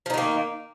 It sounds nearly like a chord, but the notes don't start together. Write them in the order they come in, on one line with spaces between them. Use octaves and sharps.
F3 D#4 D#3 A#3